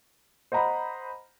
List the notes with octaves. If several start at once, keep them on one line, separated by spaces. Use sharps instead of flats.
C5 D#5 F#5 A#5 B5